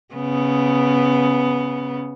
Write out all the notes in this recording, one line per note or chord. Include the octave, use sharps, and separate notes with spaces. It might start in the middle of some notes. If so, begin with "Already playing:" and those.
C#3 B3